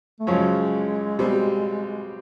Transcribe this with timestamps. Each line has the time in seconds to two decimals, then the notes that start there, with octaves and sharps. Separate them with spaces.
0.20 A3
0.27 F#2 C#3 F3 G#3
1.19 B2 G3 C4